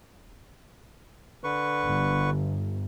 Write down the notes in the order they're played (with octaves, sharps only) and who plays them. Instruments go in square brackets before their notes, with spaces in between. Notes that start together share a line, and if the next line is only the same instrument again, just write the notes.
[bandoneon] D3 B4 C#6
[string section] G1